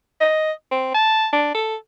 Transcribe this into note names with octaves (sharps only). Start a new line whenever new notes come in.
D#5
C4
A5
D4
A4